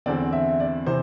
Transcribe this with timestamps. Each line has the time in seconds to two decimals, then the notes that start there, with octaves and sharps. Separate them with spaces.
0.06 E2 D3 C4 D5
0.33 E5
0.60 D5
0.86 C3 E3 C5